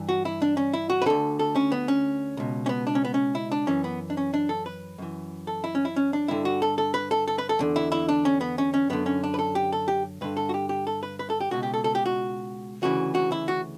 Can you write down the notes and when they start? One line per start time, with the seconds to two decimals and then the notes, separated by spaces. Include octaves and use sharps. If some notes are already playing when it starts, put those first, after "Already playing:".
Already playing: G2 E3
0.09 F#4
0.25 E4
0.42 D4
0.57 C#4
0.73 E4
0.90 F#4
1.02 B4
1.06 D2 D3 A4
1.39 A4
1.56 C#4
1.72 B3
1.88 C#4
2.37 C#2 B2
2.66 C#4
2.69 B3
2.87 D4
2.95 C#4
3.05 B3
3.14 C#4
3.35 E4
3.52 D4
3.67 F#2 E3 C#4
3.84 B3
4.10 D4
4.17 C#4
4.34 D4
4.49 A4
4.66 B4
4.98 F#2 E3
5.47 A4
5.64 E4
5.75 C#4
5.85 E4
5.96 C#4
6.13 D4
6.28 G2 D3 E4
6.45 F#4
6.62 A4
6.78 A4
6.94 B4
7.11 A4
7.28 A4
7.38 B4
7.49 A4
7.59 E2 D3
7.76 E4
7.92 E4
8.09 D4
8.25 C#4
8.41 B3
8.58 C#4
8.74 C#4
8.90 F#2 D3 B3
9.06 C#4
9.24 D4
9.34 B4
9.39 A4
9.55 G4
9.72 A4
9.88 G4
10.21 G2 D3 B4
10.37 A4
10.49 F#4
10.54 G4
10.69 G4
10.87 A4
11.03 B4
11.19 B4
11.30 A4
11.40 G4
11.51 C#2 B2 F#4
11.63 G4
11.74 A4
11.84 A4
11.95 G4
12.06 F#4
12.82 D2 C#3 E3 F#4
13.15 F#4
13.32 E4
13.48 F#4